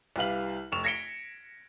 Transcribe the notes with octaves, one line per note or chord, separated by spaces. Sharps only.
C2 G4 B4 F5 F#7
F1 C#6 E7 F7
G#6 A#6 B6 C#7 D7 G7